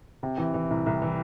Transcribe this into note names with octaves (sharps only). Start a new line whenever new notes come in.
C3
E3
E3
C2
C2
E3